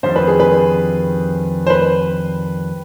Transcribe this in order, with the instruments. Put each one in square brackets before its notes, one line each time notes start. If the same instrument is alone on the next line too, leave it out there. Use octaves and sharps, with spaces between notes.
[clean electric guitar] F2 D#3 G3 D4 [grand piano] C5
[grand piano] B4
G#4
B4
C5
B4